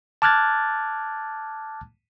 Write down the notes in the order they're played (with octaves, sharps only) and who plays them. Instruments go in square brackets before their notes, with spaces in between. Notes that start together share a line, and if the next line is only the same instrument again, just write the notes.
[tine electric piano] A5 D6 F6 F#6 G#6 A6